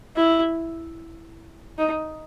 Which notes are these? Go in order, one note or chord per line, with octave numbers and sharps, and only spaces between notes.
E4
D#4